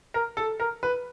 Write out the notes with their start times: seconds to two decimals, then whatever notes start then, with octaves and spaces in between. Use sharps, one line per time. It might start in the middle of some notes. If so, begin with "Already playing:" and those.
0.14 A#4
0.37 A4
0.60 A#4
0.83 B4